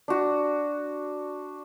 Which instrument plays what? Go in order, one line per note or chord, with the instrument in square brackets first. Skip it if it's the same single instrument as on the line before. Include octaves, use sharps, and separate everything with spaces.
[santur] D4 F#4